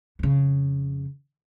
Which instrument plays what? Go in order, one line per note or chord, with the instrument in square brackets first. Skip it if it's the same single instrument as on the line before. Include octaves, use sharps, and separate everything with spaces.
[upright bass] F2 C#3